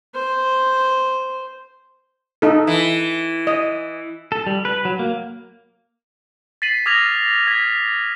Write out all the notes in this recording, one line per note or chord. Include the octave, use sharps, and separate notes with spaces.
C5
D#4 A4
E3
D#5
A4
G3
B4
F#3
A#3
A6 B6 C7 D#7 F#7
D6 D#6 F6 G#6 A#6 F7
F6 G#6 B6